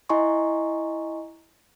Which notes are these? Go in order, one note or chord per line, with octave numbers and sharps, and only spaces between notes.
E4 D#5 G#5 A#5 C6 C#6